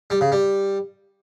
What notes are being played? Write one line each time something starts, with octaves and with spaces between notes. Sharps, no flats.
G3
C#3
G3